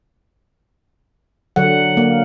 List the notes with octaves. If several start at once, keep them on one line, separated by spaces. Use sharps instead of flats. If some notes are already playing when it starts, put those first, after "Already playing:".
D3 F#3 F#5
A#3